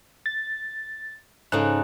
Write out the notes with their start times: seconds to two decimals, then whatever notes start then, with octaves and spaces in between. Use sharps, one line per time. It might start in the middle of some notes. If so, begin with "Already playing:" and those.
0.26 A6
1.52 G#2 C#3 D#4 A4 F#6